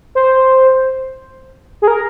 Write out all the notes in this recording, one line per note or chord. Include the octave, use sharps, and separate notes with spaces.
C5
G#4
A#4